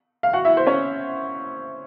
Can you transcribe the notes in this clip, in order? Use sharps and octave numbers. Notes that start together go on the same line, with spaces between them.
F5
F#4 F#5
E4 E5
C5
C#4 C#5